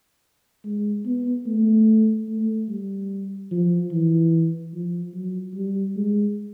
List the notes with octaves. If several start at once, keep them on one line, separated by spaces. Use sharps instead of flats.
G#3
B3
A3
A3
G3
F3
E3
F3
F#3
G3
G#3